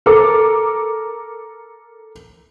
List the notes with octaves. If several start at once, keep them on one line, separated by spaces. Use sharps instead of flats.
A4 A#4 D6